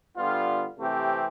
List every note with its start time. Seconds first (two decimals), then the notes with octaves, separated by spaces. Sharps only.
0.15 D3 G3 B3 F4
0.77 C3 E3 A3 C4 G4